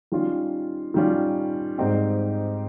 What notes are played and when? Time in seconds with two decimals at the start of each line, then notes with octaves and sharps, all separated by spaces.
0.12 D#3 G3 C#4 F4
0.94 D#3 G3 C#4 F4
1.78 G#2 G3 C4 D#4 G4